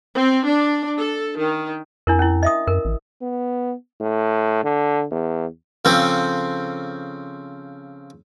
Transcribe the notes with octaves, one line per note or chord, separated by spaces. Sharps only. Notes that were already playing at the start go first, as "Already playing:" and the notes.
C4
D4
A4
D#3
F2 D4 E4 A#4
C#4 E4
D#5 E5 D#6
F#2 A#4
A1
B3
A2
D3
E2
C#3 F3 C4 A4